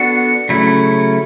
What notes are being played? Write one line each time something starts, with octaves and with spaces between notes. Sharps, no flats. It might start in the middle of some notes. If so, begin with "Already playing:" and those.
Already playing: B3 D4 F#4 A4
C#3 F#3 A3 C#4 E4